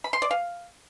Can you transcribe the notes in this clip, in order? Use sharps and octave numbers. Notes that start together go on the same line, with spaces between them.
B5
C6
D5
F5